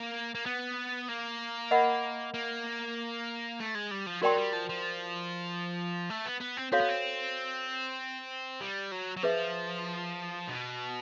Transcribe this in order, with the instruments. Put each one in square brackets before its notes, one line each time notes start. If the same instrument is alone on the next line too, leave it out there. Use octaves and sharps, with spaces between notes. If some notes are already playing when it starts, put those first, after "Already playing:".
Already playing: [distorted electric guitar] A#3
A#3
B3
A#3
[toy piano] A#4 D#5 F#5 B5
[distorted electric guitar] A#3
A3
G#3
G3
F3
[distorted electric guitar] F#3 [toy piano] F#4 A#4 D5 G5 C6
[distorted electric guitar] G3
F3
F3
A3
B3
B3
C4
[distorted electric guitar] C4 [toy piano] F#4 A4 C#5 F5
[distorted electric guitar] B3
C4
G3
F#3
F#3
[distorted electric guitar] F3 [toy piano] G#4 B4 E5
[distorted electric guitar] B2